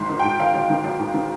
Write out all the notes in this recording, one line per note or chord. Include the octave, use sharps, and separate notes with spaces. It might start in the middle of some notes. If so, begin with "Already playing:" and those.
Already playing: G#1 G#2 C6
D#3
G#2 G5
G#1 F5
G#1
D#3
G#1
G#2
D#3